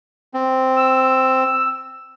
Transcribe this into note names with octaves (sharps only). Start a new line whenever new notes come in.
C4
E6